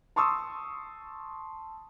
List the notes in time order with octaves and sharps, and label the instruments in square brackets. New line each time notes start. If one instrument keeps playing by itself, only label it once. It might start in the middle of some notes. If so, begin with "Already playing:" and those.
[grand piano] A5 C6 C#6 D#6 E6